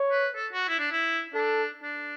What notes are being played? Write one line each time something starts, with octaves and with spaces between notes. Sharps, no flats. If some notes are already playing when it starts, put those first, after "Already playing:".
Already playing: C#5
B4
A4
F#4
E4
D4
E4
D4 A4
D4